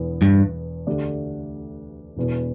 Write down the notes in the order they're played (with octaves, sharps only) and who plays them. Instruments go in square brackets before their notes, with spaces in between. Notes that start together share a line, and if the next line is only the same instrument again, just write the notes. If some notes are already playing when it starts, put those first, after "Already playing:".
Already playing: [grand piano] E1 E2 E3 B3
[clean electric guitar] G2
[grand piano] D2 D3 A3 D4 G4
E1 E2 B2